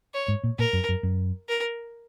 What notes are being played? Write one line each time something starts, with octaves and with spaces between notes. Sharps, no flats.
C#5
G#2
A#2
A#2 A#4
F#2
F#2
F#2
A#4